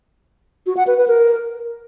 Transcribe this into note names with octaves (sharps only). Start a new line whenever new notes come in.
F#4
F#5
B4
B4
A#4